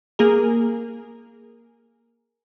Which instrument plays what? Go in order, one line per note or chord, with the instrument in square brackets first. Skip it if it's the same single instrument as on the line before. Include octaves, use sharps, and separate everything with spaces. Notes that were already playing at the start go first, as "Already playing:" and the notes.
[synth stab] A#3 G#4 A#4